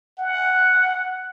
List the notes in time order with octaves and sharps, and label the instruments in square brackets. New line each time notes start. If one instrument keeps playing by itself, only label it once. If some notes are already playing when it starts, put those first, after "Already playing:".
[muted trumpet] F#5